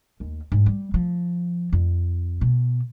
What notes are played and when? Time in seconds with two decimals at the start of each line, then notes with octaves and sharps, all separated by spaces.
0.20 D#2
0.52 G#2
0.66 G3
0.94 F3
1.72 F2
2.41 B2